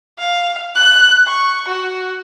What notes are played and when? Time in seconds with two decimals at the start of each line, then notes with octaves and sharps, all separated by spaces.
0.18 F5
0.75 F#6
1.27 C#6
1.68 F#4